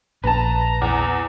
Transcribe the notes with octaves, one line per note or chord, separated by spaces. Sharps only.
A#1 A#3 B4 A5 A#5
E2